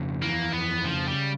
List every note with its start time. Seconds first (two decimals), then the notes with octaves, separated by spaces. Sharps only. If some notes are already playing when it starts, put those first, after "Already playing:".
Already playing: F2 C#3
0.22 E3 A#3
0.53 F2 B3
0.84 C#3 F3
1.08 G3